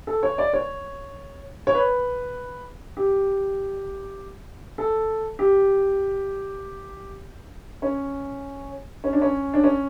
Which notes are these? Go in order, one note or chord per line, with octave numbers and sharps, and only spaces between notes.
A4
C#5
D5
C#5
C#5
B4
G4
A4
G4
C#4
C#4
D4
C#4
D4
C#4